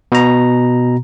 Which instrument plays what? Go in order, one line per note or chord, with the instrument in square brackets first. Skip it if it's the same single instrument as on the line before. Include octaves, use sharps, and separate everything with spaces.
[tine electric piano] B2 A#5